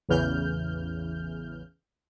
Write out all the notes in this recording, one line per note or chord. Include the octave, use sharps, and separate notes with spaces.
A1 E2 C#3 E3 F6 G6